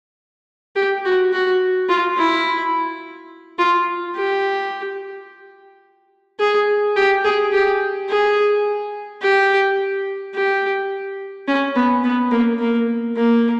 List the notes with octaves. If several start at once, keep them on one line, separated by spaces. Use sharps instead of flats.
G4
F#4
F#4
F4
E4
F4
G4
G#4
G4
G#4
G4
G#4
G4
G4
C#4
B3
B3
A#3
A#3
A#3